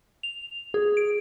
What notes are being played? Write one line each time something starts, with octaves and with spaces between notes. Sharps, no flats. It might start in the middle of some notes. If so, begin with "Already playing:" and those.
F7
G#4
D7